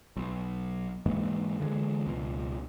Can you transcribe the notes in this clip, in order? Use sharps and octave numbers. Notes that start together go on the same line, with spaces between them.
B1
G#2 E3 G#3 A#3
D3 E3 G3 G#3
C#2 B2